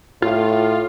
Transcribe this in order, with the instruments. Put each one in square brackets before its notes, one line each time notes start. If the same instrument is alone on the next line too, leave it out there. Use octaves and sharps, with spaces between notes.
[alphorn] A2 [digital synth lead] F4